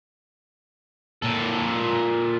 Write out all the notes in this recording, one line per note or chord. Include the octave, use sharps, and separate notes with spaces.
A#2 A4